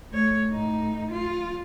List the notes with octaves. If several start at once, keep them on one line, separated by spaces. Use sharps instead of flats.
A3 C#5
A2 D#4
F4